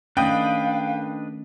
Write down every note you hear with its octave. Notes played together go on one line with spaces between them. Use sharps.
D#3 A3 C#4 D4 B4 D#5 F5 G5